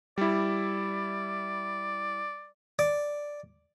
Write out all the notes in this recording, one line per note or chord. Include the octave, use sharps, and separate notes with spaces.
G3 E4 D5
D5